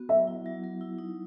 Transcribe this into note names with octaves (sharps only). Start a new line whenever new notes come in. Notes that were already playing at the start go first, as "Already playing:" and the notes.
Already playing: B3 F#4
F#3 E5
E4
F#3
F#3
E4
D#4